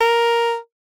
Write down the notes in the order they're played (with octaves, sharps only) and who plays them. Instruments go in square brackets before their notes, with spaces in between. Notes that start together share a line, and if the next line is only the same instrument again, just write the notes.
[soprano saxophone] A#4